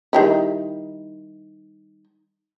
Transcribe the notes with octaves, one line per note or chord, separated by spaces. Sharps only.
D#3 G3 E4